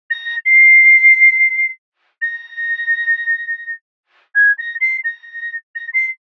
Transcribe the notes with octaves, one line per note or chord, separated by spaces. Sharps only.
A#6
C7
A#6
G#6
A#6
C7
A#6
A#6
C7